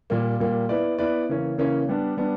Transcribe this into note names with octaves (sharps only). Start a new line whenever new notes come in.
A#2 G3 A#3
A#2 G3 A#3
B3 E4 B4 D5
B3 E4 B4 D5
C#3 E3 A#3 C#4
C#3 E3 A#3 C#4
G3 B3 D4
G3 B3 D4